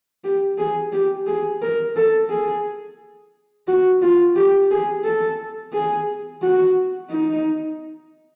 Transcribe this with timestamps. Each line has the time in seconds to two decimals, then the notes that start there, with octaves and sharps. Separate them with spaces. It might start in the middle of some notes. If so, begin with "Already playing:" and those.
0.24 G4
0.58 G#4
0.92 G4
1.26 G#4
1.62 A#4
1.96 A4
2.30 G#4
3.68 F#4
4.02 F4
4.35 G4
4.71 G#4
5.04 A4
5.73 G#4
6.42 F#4
7.10 D#4